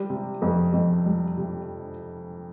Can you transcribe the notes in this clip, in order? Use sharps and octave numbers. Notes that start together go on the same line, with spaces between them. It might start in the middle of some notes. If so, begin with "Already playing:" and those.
Already playing: G3
C3
F2
F2
G3
C3